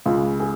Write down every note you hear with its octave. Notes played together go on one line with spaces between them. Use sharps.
C#2 C#3 F4
G#4